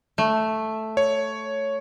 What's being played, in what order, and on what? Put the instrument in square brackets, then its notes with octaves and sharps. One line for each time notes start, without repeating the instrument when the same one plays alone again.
[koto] A3
[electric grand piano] C#5